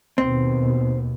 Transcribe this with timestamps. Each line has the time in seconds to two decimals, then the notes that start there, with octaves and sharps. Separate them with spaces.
0.18 D#2 B2 C4